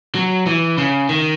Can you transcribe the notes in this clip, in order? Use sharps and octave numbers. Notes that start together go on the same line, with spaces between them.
F#3
E3
C#3
D#3